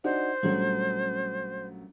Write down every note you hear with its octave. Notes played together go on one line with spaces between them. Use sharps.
D4 D#4 F#4 C5
A#1 F#3 G3 A3 C#4